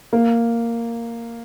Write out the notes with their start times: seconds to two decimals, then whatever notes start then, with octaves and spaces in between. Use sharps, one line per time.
0.13 A#3